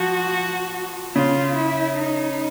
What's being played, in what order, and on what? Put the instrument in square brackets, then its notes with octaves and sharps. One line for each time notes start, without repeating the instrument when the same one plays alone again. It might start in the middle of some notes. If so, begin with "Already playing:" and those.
Already playing: [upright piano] F3 [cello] F#4
[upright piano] C#3 [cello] F4
[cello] E4
D#4